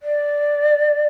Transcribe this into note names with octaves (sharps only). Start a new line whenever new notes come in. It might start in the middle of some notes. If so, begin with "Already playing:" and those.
D5